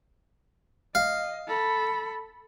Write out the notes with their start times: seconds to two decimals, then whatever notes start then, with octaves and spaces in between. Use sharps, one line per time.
0.95 D#5 F5
1.48 A4 B5